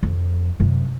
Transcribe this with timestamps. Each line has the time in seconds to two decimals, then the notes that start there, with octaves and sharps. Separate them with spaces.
0.03 F2
0.60 F#2 C3